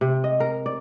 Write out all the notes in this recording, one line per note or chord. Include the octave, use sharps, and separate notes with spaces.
C3
D#5
A#4
D5